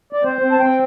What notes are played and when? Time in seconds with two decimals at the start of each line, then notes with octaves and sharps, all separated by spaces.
0.13 D5
0.23 C4 C5
0.41 C4
0.52 A5
0.60 C4 G5